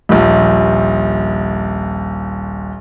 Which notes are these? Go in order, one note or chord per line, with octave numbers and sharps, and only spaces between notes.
D#1 A#1